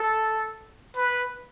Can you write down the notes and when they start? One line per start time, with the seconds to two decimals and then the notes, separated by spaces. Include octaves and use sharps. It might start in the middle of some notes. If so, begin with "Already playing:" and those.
Already playing: A4
0.97 B4